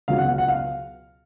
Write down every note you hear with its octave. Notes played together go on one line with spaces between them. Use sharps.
C#2 B2 F#3 F5
F#5
F5
F#5
F5